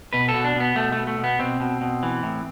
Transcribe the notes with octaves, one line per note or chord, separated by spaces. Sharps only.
B2 B4
A4
B2
D4
B2 B3
B2 A3
B2 A3
A3
B2
B3
B2 C4
B2
B2
E3
A2